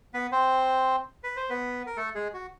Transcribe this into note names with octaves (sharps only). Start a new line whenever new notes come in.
B3 B4
C4 C5
B4
C5
B3 B4
A#4
A3 A4
G#3 G#4
F#4